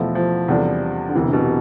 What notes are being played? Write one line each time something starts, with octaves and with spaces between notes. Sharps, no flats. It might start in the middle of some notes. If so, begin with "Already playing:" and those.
Already playing: E2 B2 F3 A3 E4 A4
F3
E2 C3 G3 D4 A4
D3
E1 D2 C3 E3
B2
C3